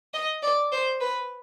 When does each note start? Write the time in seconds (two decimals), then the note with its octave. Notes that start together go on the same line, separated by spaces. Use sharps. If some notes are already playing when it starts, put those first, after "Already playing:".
0.14 D#5
0.43 D5
0.72 C5
1.01 B4